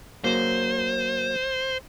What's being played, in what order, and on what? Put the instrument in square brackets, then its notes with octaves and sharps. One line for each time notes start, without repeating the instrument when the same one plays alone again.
[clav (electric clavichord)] F#3 A#3 [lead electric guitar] C5